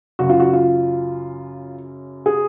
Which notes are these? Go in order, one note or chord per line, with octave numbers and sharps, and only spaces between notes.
F#2 C#3 F#4
F4
F#4
F4
G#4